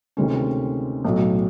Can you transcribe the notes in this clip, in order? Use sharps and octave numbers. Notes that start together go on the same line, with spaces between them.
D2 C3 D#3 G#3 C#4
B1 A2 F#3